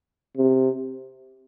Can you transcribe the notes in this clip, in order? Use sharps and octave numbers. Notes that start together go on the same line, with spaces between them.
C3